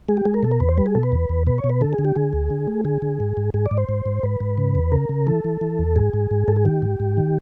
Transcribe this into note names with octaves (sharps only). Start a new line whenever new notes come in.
G#3 G#4
G4
G#3 G#4
A#4
B2 A4
A#4
E2 B4
C5
G3 B4
G#4
B2 A4
B4
E2
E2
B2 B4
C#5
B2
B4
D3 A4
G#4
D3
G4
D3 G#4
D2
D3
A3
D3 G#4
D3
G#2
G#2
G#2 G#4
D5
G#2
C5
G#2
G#2
G#2 B4
G#2
C#3
E2
C#3 A#4
C#3
E3 A4
E3
E3
E2
G#2 G#4
G#2
G#2
G#2 A4
G#4
D#3 G4
G#2
G#2
D#3